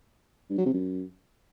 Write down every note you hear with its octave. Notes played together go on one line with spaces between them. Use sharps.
G2
F#3
C3
F#2